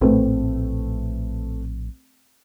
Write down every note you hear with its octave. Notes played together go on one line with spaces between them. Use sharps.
A#1 A2 A3 C4 B4